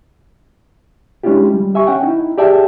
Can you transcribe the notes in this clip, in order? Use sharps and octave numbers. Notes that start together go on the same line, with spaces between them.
G#3 C#4 D4 E4 F4 G4
G3
G4 E5 G#5 C#6
C#4 F#5 G5
D#4 E4
G4 G#4 D5 E5 G5 A5